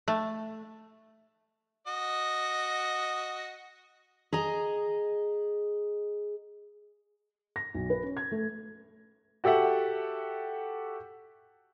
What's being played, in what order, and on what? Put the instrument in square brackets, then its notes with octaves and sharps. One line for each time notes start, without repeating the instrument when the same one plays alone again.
[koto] A3
[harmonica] F#4 D#5
[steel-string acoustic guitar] G#4 D#5 A#5
[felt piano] A#6
B1
B4
C#4
G#6
A3
[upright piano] F#4 G4 A4 E5 F#5